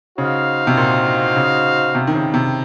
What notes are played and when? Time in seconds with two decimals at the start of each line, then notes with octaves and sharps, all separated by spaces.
0.18 C#3 D#4 F#4 C5 F5
0.67 C3
0.77 A#2
1.36 C#3
1.95 C3
2.07 D#3
2.14 C#3
2.34 C3